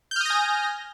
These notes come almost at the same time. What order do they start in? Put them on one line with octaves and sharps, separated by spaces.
G6 F6 D#6 A#6 G#5